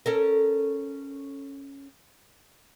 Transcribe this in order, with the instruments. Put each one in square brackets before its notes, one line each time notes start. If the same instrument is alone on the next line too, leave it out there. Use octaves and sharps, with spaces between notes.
[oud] C#4 A4 A#4